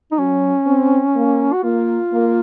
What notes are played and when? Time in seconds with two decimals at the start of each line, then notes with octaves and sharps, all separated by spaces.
0.12 D#4
0.18 F#3 C#4
0.67 C4
1.15 A#3
1.53 F#4
1.63 A#3 F4
2.12 A#3